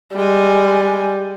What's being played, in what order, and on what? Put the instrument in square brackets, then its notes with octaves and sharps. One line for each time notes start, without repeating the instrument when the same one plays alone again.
[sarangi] G3 [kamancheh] G#3 G#5